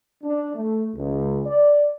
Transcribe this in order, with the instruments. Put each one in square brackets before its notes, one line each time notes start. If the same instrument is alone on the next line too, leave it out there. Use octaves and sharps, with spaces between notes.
[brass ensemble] D4
A3
C#2
D5